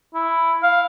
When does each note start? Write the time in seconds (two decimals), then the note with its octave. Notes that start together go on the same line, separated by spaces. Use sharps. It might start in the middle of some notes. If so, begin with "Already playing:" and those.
0.14 E4
0.63 F5